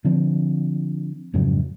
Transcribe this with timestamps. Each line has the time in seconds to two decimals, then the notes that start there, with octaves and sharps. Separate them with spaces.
0.05 D3 F3 C4
1.34 F2 G#2 C#3 F#3